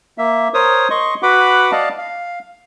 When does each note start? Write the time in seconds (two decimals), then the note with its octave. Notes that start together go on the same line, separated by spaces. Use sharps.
0.18 A#3 E5
0.54 A#4 C5 C#5 D#6
0.90 D#5 C6 C#6
1.23 F#4 B4 F#5 B5 D6
1.72 D5 D#5 F5 A5
1.98 F5